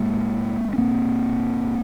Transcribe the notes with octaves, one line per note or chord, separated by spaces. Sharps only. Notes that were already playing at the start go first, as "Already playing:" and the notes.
Already playing: A2 G#3 A#3
C#4
A#2 A#3 C4